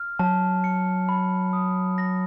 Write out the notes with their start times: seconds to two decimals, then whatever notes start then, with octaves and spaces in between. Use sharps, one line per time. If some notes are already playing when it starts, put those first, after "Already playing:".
Already playing: F6
0.19 F#3 A5
0.64 C#7
1.09 B5
1.53 D#6
1.98 A#6